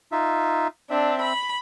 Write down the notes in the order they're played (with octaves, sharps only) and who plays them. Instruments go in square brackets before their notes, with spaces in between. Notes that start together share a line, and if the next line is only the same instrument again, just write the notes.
[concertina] D#4 F4 E5
[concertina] C4 E5 [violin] D4
[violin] B5